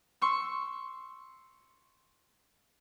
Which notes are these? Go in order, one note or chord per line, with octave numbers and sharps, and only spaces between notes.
C6 C#6 E6